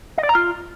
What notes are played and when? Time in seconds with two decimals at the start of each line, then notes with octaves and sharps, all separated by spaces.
0.18 D#5
0.23 D5
0.29 A#5
0.35 F4